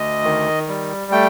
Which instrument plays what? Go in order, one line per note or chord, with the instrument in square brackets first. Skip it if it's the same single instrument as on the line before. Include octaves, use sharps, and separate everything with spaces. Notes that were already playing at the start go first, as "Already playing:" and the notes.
Already playing: [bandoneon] D2 D#5
D#3
G3
A3 G5